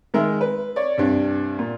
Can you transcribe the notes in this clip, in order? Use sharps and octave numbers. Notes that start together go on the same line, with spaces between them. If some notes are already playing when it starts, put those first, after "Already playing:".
D#3 G#3 A#4 E5
B4
C#5 D5
C2 G2 D4
A#2